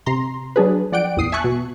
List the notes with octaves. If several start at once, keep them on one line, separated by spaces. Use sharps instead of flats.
C3 A#5 C6
F#3 D4 G#4 B4
F3 D5 F#5 G5 D7
A#1 E2 D#6 C7
E5 G#5 A5 C#6 F#6
B2